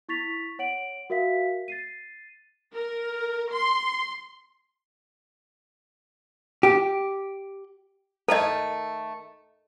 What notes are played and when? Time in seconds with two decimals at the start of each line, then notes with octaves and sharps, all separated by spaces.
0.09 E4 C#6 A6 B6 F7
0.59 C#5 F#5 D7 F#7
1.10 F#4 A#4 E5 F5 B6
1.68 A6 C7 D#7
2.74 A#4
3.52 C6
6.63 G4
8.28 D#3 A3 A4 A#4 D#5